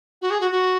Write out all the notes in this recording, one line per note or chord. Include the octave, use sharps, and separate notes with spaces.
F#4
G#4
F#4
F#4